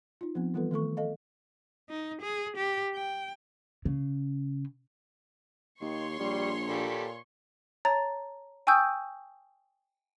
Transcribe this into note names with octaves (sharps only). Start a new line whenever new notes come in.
D#4 F4
F3 B3 C4
E3 G3 B3 F4 A4 B4
D#3 A3 A4 C#6
A4 D#5 F5
D#4
G#4
G4
G5
C#3
D#2 D#3 C#5 C6 C#6
A#1 G3
A#2 G4 A4 B5
C#5 A5 A#5 A6
G5 G#5 C#6 D#6 E6 G6